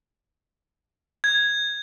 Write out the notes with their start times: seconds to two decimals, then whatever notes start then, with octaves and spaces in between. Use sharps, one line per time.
1.24 G#6